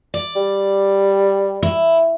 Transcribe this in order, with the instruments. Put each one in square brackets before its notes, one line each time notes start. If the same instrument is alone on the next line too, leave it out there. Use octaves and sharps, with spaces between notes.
[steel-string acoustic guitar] D5
[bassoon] G3
[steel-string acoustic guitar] E4